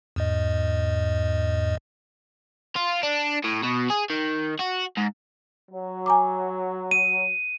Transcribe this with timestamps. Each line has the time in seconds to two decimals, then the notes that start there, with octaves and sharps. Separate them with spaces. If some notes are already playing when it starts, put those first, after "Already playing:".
0.16 E2 G#2 D#5
2.76 F4
3.03 D4
3.44 A2
3.64 B2
3.90 G#4
4.10 D#3
4.60 F#4
4.97 G#2
5.72 F#3
6.06 G#5 A#5 D6
6.91 D#7